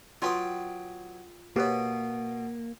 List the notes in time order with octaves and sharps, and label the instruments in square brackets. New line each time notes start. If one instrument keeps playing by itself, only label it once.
[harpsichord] F#3 B4 D#6 [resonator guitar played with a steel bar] F4 G5 G#5
[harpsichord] B2 B3 [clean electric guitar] A#3 [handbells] G4 B4 C#5